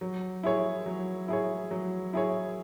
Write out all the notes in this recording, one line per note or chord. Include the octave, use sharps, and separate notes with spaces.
F#3
E4 G#4 C#5
F#3
E4 G#4 C#5
F#3
E4 G#4 C#5